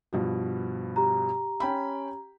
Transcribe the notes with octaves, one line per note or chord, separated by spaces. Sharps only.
G2 B2 F3
G4 A#5
C#4 G5 B5